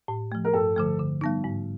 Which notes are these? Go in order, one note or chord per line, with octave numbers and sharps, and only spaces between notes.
A2
F3 A3
A#4
G2 A4
D3 F3 A3
D3
G3 B3 D#4
G#2